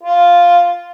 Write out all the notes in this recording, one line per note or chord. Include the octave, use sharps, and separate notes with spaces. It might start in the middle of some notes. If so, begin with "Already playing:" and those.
F4